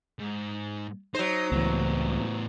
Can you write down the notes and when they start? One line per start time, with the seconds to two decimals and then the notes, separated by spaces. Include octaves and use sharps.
0.19 G#2
1.15 F#3 D#4 C5
1.52 C#2 A2 E3 B3